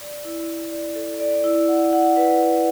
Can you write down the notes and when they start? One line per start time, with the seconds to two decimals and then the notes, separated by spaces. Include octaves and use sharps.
0.01 D5
0.25 E4
0.48 E4
0.72 D5
0.96 A4
1.20 D5
1.44 E4
1.68 F#5
1.93 F#5
2.17 B4
2.41 F#5